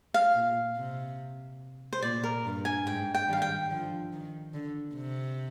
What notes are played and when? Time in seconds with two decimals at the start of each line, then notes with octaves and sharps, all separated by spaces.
0.14 F5
0.35 A#2
0.77 C3
1.93 C5
2.02 A#2 D5
2.24 A#4
2.45 G2
2.65 G#5
2.86 G#2 G5
3.15 G5
3.28 D#3 G3 F5
3.42 G5
3.70 D3 F3
4.13 D#3
4.54 D3
4.95 C3